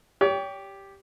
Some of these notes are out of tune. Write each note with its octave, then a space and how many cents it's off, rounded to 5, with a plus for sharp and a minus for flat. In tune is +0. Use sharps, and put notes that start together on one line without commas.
G4 +0 C#5 +40